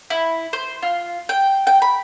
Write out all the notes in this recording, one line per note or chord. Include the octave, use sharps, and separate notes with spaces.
E4
C5
F4
G5
G5
B5